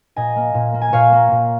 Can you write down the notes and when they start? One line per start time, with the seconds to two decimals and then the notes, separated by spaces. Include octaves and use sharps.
0.16 A#2 D#5 G#5
0.36 A#3
0.54 A#2
0.74 A#3
0.81 G#5
0.93 A#2 C#5 F5
1.12 A#3
1.31 A#2